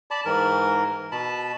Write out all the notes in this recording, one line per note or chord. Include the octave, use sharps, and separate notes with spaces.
D5 A5 B5
G#2 E3 A#4
B2 A5 B5